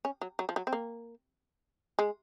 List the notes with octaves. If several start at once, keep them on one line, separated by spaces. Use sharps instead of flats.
C#4
F#3
F#3
F3
F#3
C4
A#3
G#3